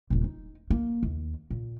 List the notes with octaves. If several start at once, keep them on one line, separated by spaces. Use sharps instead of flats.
D#1 A#2
D#4
A#3
D#2
A#2